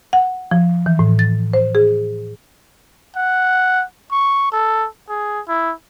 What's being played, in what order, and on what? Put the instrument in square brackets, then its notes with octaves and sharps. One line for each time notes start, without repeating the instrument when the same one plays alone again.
[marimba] F#5
F3
E3
A2
A6
C5
G#4
[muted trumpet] F#5
C#6
A4
G#4
E4